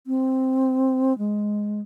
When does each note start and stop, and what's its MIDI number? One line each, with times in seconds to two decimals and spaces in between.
0.07 1.16 60
1.18 1.81 56